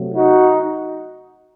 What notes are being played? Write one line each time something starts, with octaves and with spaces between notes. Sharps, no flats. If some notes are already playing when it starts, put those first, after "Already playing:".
Already playing: C3 F#3 A3
D#4 F#4